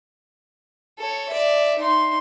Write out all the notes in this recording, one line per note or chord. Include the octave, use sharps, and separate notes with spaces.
A4 C#5
D5 E5
D#4 C6